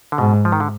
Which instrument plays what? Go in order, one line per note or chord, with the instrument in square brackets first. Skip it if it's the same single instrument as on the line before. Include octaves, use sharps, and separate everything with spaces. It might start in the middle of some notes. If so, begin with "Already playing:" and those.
[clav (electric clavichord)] D3
[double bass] G#2 [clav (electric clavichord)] B2
[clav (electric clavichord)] F3
D#3
D3